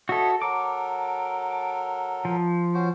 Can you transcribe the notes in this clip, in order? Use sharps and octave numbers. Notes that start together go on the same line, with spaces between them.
F#4 A4 C#5 D#5 E5
F#3 A4 A#4 D6
F3
C#4 F#4 C5